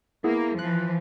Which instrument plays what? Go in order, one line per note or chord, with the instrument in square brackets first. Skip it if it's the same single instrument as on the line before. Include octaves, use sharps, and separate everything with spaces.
[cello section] A#3 [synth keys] B3 E4 G#4
[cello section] E3 F3 [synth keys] F#6